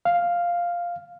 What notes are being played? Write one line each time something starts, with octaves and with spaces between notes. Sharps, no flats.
F5